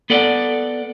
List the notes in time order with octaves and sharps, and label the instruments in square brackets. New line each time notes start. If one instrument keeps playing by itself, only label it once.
[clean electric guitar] B3 A4 D5 F#5